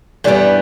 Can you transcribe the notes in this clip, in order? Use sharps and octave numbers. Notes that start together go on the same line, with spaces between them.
G2 E3 G3 B3 D4